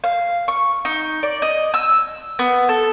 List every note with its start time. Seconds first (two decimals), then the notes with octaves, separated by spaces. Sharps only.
0.04 F5
0.48 C#6
0.85 D#4
1.23 D5
1.42 D#5
1.74 E6
2.39 B3
2.69 A4